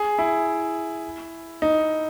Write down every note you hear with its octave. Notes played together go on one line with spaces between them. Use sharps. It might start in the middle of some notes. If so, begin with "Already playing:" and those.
Already playing: G#4
E4
D#4